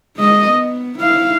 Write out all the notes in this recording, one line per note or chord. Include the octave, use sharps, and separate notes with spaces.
G#3 D#5
B3
E4 F5